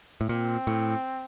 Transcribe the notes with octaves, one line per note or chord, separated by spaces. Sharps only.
A2
A#2 C4
A2